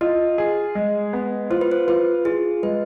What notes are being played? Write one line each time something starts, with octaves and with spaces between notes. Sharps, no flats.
F4 D#5
G#4
G#3
B3
F4 C5
B4
C5
F4 B4
F4 G#4
G#3 B4